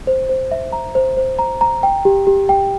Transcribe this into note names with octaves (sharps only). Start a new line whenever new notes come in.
C5
C5
E5
A#5
C5
C5
A#5
A#5
G5
G4
G4
G5